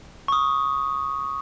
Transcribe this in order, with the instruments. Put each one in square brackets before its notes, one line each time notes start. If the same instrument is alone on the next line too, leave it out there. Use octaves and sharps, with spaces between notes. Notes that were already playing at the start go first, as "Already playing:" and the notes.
[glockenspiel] C#6 D#6